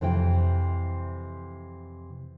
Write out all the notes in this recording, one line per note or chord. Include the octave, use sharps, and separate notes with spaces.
F2 C3 E3 E4 G5